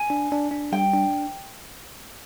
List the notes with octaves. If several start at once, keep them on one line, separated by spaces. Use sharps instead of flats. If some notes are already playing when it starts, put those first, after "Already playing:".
Already playing: G#5
D4
D4
D4
G3 G5
D4